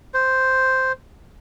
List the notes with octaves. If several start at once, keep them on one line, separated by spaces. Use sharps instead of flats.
C5